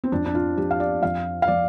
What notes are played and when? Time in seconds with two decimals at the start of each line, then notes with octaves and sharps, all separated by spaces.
0.04 C4
0.12 F2 D4
0.26 D4
0.35 F4
0.58 F3 G4
0.71 F5
0.80 D5
1.03 F2 F5
1.42 F5
1.48 F3 D5